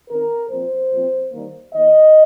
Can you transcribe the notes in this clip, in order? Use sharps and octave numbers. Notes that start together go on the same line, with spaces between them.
D#3 C4 A#4
A#2 F3 C4 C5
A#2 F3 C4
D#3 G3 A#3
D#3 A#3 D#5